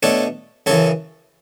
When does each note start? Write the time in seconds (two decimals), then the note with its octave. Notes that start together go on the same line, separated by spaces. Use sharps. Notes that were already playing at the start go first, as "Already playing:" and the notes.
0.03 B2 A3 D4 A4 C#5
0.66 F#2 C#3 E3 A4 C#5